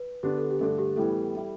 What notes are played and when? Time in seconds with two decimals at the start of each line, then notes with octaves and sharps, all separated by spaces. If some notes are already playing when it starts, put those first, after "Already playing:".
Already playing: B4
0.23 D3 B3 D4 G4
0.38 A4
0.51 G4
0.59 G2 D3 A3 D4 A4
0.78 G4
0.96 A2 E3 G3 B3 A4
1.35 G3 E4